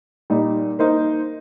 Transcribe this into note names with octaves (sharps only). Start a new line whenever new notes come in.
A#2 G3 D#4
A#3 D#4 C5